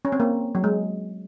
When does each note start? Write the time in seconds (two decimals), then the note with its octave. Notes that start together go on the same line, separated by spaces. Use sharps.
0.05 C#4
0.12 C4
0.20 A#3
0.55 F#3
0.64 G#3